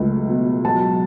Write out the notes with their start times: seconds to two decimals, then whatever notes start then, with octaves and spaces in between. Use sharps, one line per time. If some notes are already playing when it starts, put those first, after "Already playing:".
Already playing: C#2 F#3 A3
0.29 B2
0.64 F#3 A5